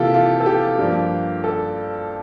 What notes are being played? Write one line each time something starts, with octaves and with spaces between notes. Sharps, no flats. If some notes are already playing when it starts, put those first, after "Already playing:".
Already playing: C3 E3 A#3 E4 F4 G4 A4
F4
A4
G4
G2 F3 A#3
A4